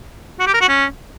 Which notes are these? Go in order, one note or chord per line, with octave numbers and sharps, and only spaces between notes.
F#4
G4
A#4
F#4
C#4